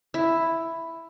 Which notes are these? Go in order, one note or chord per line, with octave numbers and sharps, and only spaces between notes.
E4